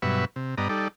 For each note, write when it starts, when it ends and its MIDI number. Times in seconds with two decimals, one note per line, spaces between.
0.02 0.25 43
0.02 0.25 47
0.02 0.25 54
0.02 0.25 71
0.02 0.25 76
0.02 0.25 85
0.36 0.55 48
0.58 0.68 43
0.58 0.68 59
0.58 0.68 74
0.58 0.68 75
0.58 0.68 82
0.69 0.88 55
0.69 0.88 63
0.69 0.88 69
0.69 0.88 74